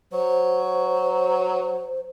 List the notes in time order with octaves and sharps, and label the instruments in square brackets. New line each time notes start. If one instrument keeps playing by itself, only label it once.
[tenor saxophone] F#3 [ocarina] C5